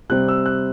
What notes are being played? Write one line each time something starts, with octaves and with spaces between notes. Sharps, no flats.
C3 G3 C4 F#6
E6
F#6